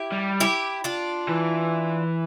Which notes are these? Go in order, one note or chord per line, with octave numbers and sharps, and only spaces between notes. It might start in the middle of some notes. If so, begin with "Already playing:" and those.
Already playing: E4 G4
G3
E4 G4
D4 F4
E3